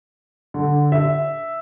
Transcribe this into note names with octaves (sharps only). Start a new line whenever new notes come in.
D3
E5